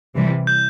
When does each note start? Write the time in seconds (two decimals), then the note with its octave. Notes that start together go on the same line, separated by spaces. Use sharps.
0.16 C3 E3 G3
0.47 G6